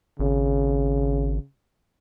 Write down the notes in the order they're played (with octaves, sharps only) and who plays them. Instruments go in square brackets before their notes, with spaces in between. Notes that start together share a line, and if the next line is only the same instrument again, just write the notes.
[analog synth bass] G#1 [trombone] C#3